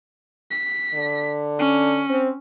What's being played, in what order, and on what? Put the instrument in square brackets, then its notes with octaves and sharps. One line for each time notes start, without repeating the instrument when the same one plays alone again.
[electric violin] B6
[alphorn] D3
[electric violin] C#4
[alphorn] C4